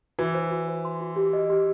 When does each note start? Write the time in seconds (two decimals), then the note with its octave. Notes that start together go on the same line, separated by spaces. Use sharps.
0.19 E3 F#4
0.35 C5
0.51 F#4
0.68 C5
0.85 C6
1.01 F#4
1.16 G4
1.33 D#5
1.50 G4